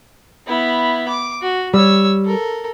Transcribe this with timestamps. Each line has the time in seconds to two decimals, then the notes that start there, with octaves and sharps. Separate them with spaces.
0.47 B3 E4
1.08 D6
1.42 F#4
1.74 G3 C#5 E6
2.25 A4 A#4